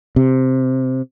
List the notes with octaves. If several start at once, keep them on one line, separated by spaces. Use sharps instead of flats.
C3